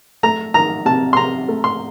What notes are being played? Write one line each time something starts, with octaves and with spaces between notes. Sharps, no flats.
A3 A#5
D#3 A#5
C3 A5
C6
C3 A#5
A3
C6